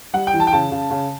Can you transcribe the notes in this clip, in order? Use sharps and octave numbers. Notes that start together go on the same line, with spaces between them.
G3 F#5
G5
E3
A5
G5
C#3 A5
C#3
C#3